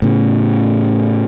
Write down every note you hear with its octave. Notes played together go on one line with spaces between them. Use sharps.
A2 C#3